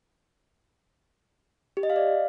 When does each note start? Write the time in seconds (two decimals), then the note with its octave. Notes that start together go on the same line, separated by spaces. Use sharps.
1.77 G4
1.83 D#5
1.90 F5
1.96 D5